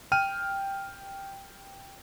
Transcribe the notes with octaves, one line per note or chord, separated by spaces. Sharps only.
G5 F6 D#7